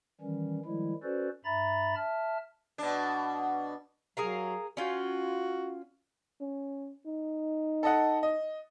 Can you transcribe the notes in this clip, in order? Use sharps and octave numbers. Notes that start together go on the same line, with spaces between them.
D#3 E3 G3 C#4
D#3 F3 G3 G#3 E4
C#4 F#4 A4 B4 C5 D5
G2 E5 A#5 B5 A6
E5 A5 F6
B2 D4
F#3 G#4 A#4 F5
C#4 F4 F#4 G5
C#4
D#4
A4 D#5 F#5
D#5